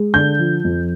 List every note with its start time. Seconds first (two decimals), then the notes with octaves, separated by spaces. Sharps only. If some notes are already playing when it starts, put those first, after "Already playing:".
Already playing: G#3
0.14 D3 G6
0.39 F3
0.64 F2